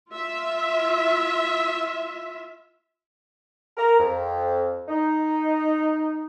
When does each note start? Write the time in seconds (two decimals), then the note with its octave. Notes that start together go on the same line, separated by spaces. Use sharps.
0.11 F4 E5
3.77 A#4
3.99 F2
4.88 D#4